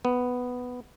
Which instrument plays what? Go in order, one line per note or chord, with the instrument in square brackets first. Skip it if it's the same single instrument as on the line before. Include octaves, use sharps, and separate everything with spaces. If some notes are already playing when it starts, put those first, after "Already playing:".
[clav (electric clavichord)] B3